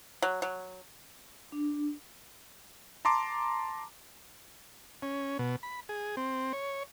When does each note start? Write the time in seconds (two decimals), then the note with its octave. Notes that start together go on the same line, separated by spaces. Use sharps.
0.22 F#3
0.42 F#3
1.52 D4
3.05 A5 A#5 C6 D6
5.02 C#4
5.39 B2
5.63 B5
5.89 G#4
6.17 C4
6.53 C#5